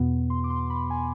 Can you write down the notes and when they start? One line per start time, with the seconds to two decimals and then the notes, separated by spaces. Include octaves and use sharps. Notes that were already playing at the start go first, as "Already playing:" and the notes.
Already playing: E2 B2 B3
0.30 C6
0.44 D6
0.50 C6
0.70 B5
0.90 G#5